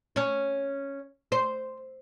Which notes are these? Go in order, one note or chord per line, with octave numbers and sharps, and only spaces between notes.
C#4 C#5
C5